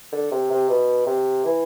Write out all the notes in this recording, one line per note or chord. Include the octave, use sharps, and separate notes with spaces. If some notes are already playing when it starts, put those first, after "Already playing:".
D3
C3
C3
B2
C3
E3